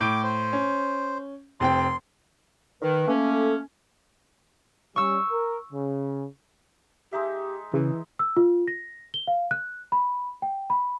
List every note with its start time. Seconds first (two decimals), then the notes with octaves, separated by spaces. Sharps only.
0.01 A2 D6 G6 D7
0.23 C5
0.53 C#4
1.60 F1 C4 G5 C6
2.82 D#3 B4
3.07 A3 A#3 C#4
3.31 A4
4.96 G3 C#4 C#6 E6
5.30 A#4
5.73 C#3
7.13 G#3 D#4 G4 E5
7.74 C#3 E3
8.19 E6
8.37 F4
8.68 A#6
9.14 G7
9.27 F5
9.51 F#6
9.92 B5
10.42 G5
10.70 B5